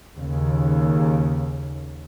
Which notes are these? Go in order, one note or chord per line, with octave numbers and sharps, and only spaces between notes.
D#2 C#3